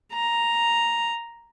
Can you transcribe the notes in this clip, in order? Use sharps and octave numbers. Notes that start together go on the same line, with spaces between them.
A#5